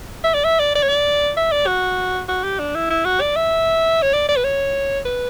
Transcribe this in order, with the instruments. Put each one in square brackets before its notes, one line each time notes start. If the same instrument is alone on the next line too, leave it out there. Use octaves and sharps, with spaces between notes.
[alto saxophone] E5
D5
E5
D5
D5
C#5
D5
E5
D5
F#4
F#4
G4
D4
E4
E4
F#4
D5
E5
C#5
D5
D5
B4
C#5
B4